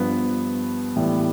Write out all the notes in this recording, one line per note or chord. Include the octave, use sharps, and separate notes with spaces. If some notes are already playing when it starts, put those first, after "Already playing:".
Already playing: G2 F3 B3
A2 E3 G3 B3